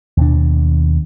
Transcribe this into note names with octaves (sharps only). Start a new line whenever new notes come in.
D#2 B2 D4